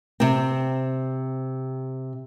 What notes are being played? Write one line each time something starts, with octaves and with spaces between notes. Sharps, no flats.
C3 C4